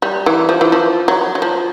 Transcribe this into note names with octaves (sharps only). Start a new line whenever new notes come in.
G3
E3
F3
E3
F3
F#3
F#3
F3